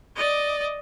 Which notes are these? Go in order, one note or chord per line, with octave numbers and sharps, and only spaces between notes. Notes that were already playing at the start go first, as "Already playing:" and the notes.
D5 D#5